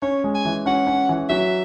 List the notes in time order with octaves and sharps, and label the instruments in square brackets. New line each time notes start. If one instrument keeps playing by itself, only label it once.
[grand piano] C#4 [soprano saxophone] C#5
[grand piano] G#3
[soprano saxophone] G#5
[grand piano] E3
[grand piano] C#4 [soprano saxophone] F#5
[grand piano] C#4
E3
[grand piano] F#3 [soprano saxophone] E5